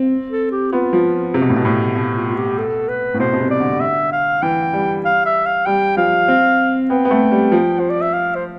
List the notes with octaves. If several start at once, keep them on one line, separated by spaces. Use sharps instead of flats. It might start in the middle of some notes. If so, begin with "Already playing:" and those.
Already playing: C4
A4
G4
B3 F4
F3
C3
B2
A2
B2
A2
B2
F4
F4
G4
A4
B4
A2
B2 C5
B2
C3
D5
D3
E5
F5
E3 G5
G3
F5
E5
F5
G3 G5
F3 F5
C4
B3 G5
B3
A3
G3
F3
C5
D5
E5
F5
C5